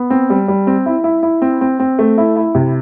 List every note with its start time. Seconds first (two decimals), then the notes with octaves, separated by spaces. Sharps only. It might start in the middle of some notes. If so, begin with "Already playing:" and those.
Already playing: B3
0.10 C4
0.30 G3
0.48 G3
0.67 C4
0.86 E4
1.04 E4
1.23 E4
1.42 C4
1.61 C4
1.80 C4
1.99 A3
2.18 E4
2.36 E4
2.55 C3